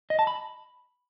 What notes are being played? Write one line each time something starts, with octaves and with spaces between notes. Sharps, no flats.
D#5
A5
B5